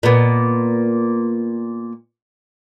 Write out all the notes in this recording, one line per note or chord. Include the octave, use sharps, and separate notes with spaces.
A#2 B3